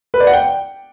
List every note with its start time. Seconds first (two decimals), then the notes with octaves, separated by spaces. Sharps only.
0.14 B4
0.20 D5
0.27 F#5
0.33 G5